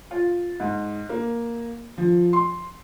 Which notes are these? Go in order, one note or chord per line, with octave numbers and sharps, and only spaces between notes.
F4
G#2
A#3
F3
C6